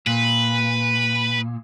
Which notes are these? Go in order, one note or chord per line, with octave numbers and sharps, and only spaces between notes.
A#2 B4